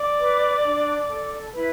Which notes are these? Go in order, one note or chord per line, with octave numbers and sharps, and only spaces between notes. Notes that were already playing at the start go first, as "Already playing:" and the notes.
Already playing: D5 D6
B4
D4
A4
E4 B4 B5